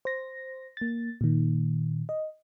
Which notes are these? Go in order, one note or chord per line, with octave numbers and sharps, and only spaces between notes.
C5 A#6
A#3 A6
A#2 D#3
D#5